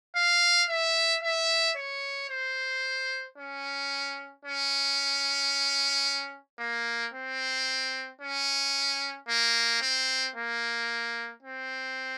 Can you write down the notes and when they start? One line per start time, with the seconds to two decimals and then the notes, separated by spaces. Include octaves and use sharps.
0.16 F5
0.69 E5
1.23 E5
1.76 C#5
2.30 C5
3.38 C#4
4.45 C#4
6.59 A#3
7.14 C4
8.21 C#4
9.28 A#3
9.81 C4
10.35 A#3
11.43 C4